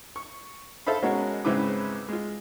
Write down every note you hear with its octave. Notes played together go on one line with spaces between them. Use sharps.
C#6
A4 C5 E5 F5 B5
B2 G#3 C#4 F#4 A#4
G#2 C#3 C4 E4 B4 D6
G#3 F4